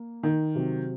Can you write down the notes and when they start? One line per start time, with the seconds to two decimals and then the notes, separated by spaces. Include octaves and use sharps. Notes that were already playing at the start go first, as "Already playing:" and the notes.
Already playing: A#3
0.23 D#3
0.55 C3 F#3 C4